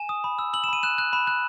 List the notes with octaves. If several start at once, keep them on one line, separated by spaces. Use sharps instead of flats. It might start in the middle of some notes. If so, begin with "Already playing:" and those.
Already playing: G#5 E7
D#6
B5
E6
E6 F#7
E7
B5 D#7
F#6 E7
F#6
B5 E7
F#6